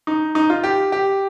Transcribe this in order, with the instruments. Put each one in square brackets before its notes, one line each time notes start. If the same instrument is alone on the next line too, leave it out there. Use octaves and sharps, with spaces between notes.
[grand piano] D#4
D#4
F4
G4
G4